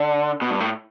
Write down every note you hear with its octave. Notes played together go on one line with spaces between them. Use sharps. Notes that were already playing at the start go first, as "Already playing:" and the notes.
Already playing: D3
B2
G2
A2